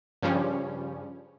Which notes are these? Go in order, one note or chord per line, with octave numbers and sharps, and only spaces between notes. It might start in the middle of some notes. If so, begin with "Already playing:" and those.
G2 C#3 F3 G3 C#4